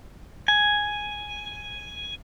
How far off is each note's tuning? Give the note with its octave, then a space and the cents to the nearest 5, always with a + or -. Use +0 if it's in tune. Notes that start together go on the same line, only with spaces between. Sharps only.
G#5 +0